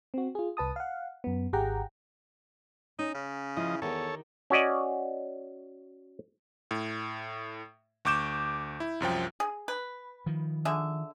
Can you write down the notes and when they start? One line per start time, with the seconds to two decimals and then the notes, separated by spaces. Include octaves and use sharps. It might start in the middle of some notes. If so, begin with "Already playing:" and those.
0.14 C4 F#4
0.35 F4 G#4
0.57 C2 B4 A5 D#6
0.76 F5 F#5
1.24 F#2 B3
1.53 G#1 G4 G#4 F#5 G5 A#5
2.99 C#4 D#4
3.15 C#3
3.57 F3 E4 D#5
3.82 E2 D#3 G4 A4 C#5
4.50 C#4 F#4 D5 D#5
6.71 A2
8.05 D2 C#6 D6 G6 E7
8.80 E4
9.00 C2 F#2 F3 G5
9.40 G#4
9.68 B4
10.26 D#3 F3
10.65 D3 G#4 E5